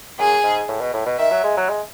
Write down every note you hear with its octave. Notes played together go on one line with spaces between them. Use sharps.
F#2 G#4
G#2
A2
B2
A2
B2
D#3 E5
F#3
G#3
F#3
G#3